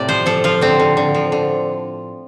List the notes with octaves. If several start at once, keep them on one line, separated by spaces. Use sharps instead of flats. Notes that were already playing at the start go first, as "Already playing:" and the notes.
Already playing: A2 C3 G4 A4 D5
F3 C5
F3 A4
F3 F4
D3 C4
D3
D3
F3
D3